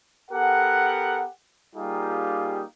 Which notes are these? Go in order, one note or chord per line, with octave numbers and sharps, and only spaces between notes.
B3 G4 A4 A#4 F#5
G3 A#3 D#4 F4 G4 G#4